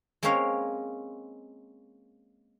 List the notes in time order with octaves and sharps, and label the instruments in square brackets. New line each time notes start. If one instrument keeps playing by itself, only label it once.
[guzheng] G#3 A#3 C4 C#4 C#5 F5